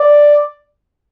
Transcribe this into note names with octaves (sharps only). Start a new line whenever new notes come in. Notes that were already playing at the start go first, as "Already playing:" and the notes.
Already playing: D5